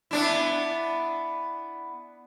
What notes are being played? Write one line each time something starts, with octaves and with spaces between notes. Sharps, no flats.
B3 D4 E4